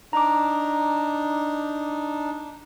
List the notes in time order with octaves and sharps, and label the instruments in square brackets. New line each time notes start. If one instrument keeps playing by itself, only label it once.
[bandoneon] D4 D#4 [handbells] A#5 D6